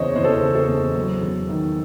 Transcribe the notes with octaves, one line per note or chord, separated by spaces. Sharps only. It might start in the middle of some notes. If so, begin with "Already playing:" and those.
Already playing: E2 C#3 E3 C5 C#5 D#5
E2 C5
A4
C5
C#3
A4
E2
F#3
E2
D#3